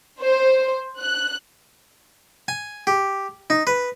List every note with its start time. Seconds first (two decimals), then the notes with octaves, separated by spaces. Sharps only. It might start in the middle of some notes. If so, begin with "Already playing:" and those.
0.21 C5
1.00 F#6
2.48 G#5
2.87 G4
3.50 D#4
3.67 B4